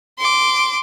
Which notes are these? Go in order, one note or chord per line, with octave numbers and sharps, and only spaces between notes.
C6 D6